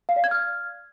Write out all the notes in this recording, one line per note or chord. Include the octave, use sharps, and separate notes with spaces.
F5
D5
G#6
F6